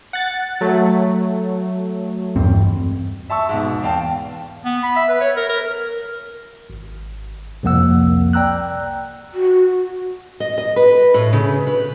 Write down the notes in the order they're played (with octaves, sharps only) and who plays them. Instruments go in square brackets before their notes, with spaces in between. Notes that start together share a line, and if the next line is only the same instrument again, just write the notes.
[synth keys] F#5 A6
F#3 A3
[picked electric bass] E2 G2 C4
[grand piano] E5 A5 C#6 E6
G#2 B2
E2 F5 G5 A5
[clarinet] B3
B5
E5
B4
C#5
A#4
A#4
[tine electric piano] G#1
C2 F2 F3 A#3 F#5 E6
D5 G5 A#5 E6 F#6
[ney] F#4
[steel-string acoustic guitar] D#5
D#5
B4
A2
C#3
B4